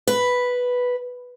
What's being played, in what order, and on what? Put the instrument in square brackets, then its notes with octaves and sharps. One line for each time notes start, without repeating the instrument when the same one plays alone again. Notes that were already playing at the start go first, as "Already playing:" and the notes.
[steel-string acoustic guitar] B4